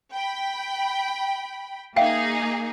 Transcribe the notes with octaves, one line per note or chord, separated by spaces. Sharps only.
G5 B5
A#3 D#4 G#4 E5 F5 G5